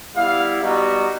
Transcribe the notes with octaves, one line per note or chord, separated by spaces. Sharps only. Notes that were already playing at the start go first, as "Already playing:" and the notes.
G3 B3 E4 F5
G3 B3 D#4 F#4